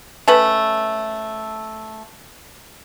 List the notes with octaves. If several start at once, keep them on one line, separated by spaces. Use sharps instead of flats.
A3 C#4 A4 B4